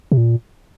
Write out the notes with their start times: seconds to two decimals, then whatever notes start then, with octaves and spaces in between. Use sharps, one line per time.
0.12 C3
0.17 A#2